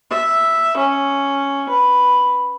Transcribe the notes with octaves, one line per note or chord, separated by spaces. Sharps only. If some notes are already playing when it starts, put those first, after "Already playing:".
E5
C#4
B4